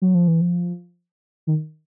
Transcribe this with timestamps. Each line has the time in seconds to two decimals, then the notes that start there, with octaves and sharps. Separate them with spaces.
0.02 F#3
0.14 F3
0.28 E3
0.41 F3
1.47 D#3